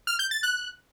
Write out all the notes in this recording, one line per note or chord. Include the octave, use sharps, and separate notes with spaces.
F6
G6
A6
F#6